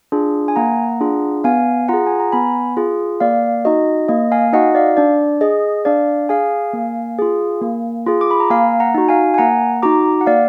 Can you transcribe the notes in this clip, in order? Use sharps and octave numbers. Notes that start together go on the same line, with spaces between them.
D4 F4 G#4
G#5
A#3 F#5 A#5
D4 F4 G#4
B3 F5 G#5
F4 G#4 F#5 A#5
G#5
A#5
B3 G#5 B5
F4 G#4
A#3 D5 F5
D#4 F#4 D#5
A#3 D#5
F5 G#5
D#4 F#4 D#5 F#5
D5 F5
D4 D5
G#4 D#5
D4 D5 F5
G#4 F5 G#5
A#3
F4 G#4
A#3
F4 G#4
D6
B5
A#5
A#3 F5 G#5
F#5 A#5
D#4 F#4
F5 G#5
G#5
A#3 F#5 A#5
D#4 F#4 A#5 D6
F#5
A#3 D5 F5